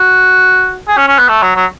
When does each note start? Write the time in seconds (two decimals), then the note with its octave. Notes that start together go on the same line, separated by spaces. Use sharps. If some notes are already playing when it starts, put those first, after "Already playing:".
Already playing: F#4
0.88 G#4
0.97 C#4
1.07 C#4
1.19 B3
1.29 A3
1.42 F#3
1.56 F#3